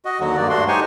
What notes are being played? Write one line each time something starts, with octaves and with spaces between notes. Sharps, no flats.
F#4 D#5
D#2 D3 F#3 F#4
G2 A#3 D5
G2 A3 D4 F#4 C6
D#4 G4 C5 C#5 G#5 C#6